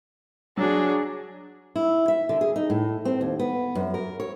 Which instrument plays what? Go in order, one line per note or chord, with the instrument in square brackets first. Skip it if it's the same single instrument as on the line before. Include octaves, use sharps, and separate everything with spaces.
[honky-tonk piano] F#3 F#4 [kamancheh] D4 G#4
[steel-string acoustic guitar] E4
E5
D3
G#4
D#4
A2
C4
D#2
B3
F#2
A#4
C#5